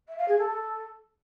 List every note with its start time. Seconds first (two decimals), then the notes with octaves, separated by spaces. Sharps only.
0.08 E5
0.18 F5
0.28 G#4
0.38 A4
0.48 A4